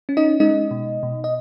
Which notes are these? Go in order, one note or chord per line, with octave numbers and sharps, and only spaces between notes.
C#4
D#4 D#5
G#3 D#4 D#5
B2
B2
D#5